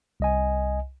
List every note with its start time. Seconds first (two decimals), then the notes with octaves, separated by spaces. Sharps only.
0.20 C2 D#5 G#5